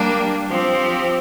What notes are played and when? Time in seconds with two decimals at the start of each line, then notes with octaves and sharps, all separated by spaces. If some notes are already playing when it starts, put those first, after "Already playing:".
Already playing: G3 A#3 D4
0.49 F3 C4 G4